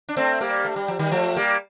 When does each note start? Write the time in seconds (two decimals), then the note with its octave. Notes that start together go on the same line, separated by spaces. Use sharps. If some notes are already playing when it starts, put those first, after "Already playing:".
0.09 D4
0.17 A3 C4
0.41 G3 A#3
0.65 A3
0.76 G3
0.88 F3
0.99 D#3 G3
1.12 F3 A3
1.36 G3 A#3